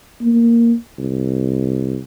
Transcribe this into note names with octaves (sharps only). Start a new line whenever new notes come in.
A#3
C2